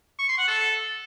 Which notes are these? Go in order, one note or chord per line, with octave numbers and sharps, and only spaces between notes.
C#6
C6
F#5
A4